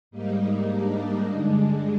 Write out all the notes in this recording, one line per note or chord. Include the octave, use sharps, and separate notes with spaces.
G#2 G3 A#3 D#4
D4
G2 D3 G#3